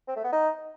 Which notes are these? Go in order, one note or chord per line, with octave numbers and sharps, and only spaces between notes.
C4
A3
B3
D#4